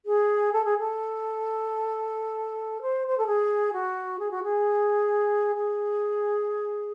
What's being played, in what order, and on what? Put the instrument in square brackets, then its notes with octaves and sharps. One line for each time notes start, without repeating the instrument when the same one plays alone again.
[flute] G#4
A4
G#4
A4
C5
C5
A4
G#4
F#4
G#4
F#4
G#4
G#4